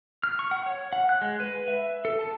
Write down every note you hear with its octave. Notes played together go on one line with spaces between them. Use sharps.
F6
C#6
F#5
C#5
F#5
F#6
G#3
B4
E5
A4
A5